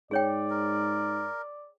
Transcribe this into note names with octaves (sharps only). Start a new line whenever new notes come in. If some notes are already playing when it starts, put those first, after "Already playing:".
G#2 G#4 C#5 D5 G5
A#4